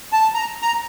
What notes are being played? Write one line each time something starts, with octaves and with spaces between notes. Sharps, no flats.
A5
A#5
A#5